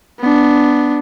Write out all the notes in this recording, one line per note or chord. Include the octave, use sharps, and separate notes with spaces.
B3 D4